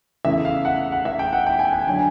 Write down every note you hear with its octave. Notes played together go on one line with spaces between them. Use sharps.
E2 C#3 E3 A3 E5
F5
F#5
F#5
E5
G5
F#5
G5
G#5
G#5
D3 F#3 G#5